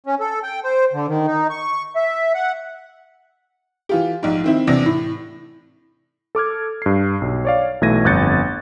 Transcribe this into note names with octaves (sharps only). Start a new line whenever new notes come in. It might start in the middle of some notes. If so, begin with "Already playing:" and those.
C#4
A4
G5
C5
D3
D#3
D#4
C#6
E5
F#5
E3 F4 G4
A#1 G#2
D#3 C4 E4
E2 C3 D4 A#6
A2
A4 D6 F6 G#6
G2 C7
B1
C#5 D5 F5
B1 E3 A3 G#6 A#6 D#7
G1 F2 F#6 G6 A6 C#7